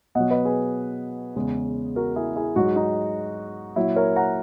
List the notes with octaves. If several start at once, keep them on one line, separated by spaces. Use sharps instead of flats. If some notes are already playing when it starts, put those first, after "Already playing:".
B2 F#3 D#5 F#5
B4 D#5
G#4 B4
E2 C#3 G#3
F#4 A#4
E4 G#4
E4 G#4
G#2 F#3 D#4 F#4
D#4
A#2 F#3 E4
A#4 C#5
F#5 A#5